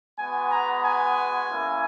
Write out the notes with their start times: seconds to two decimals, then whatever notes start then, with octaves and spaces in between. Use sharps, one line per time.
0.18 G#3 B3 F#4 G#5
0.51 A#5
0.84 G#5
1.49 A#3 C#4 E4